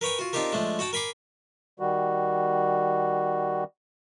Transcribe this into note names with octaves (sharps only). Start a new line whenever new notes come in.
A#4 B4 C#5 G5 G#5
F4 F#4
C4 D4 D#4 F4 G4 A#4
F3 G#3 A3 D4
F#4 F#5 G5 A5
A#4 G#5 B5 C6 D6
D#3 G3 F#4